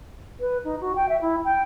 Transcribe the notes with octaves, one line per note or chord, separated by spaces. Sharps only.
B4
D#4
F#4
G5
E5
E4
G5